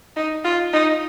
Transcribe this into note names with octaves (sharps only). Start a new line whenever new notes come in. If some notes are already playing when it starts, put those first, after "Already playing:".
D#4
F4
D#4